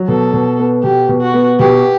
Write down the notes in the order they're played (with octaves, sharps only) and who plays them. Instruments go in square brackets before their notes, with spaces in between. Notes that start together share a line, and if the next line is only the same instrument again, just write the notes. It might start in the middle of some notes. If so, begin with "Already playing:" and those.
Already playing: [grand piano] F#3
[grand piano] B2 [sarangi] A4
[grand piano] B2
B3
[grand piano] B2 [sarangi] G4
[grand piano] B2
[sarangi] F#4
[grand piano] B3
[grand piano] B2 [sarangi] G4